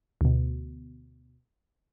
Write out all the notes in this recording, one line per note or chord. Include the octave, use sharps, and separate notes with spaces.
D2 B2